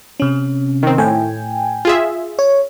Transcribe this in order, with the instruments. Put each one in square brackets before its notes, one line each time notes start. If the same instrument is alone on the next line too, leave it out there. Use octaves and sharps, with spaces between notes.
[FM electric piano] C3 C#4
[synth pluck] D#3 C4
[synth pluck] A2 [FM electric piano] G5 G#5
[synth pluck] F4 G#4 E5
[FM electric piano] C#5